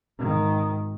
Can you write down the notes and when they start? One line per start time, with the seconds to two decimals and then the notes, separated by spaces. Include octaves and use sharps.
0.19 G#1 D#3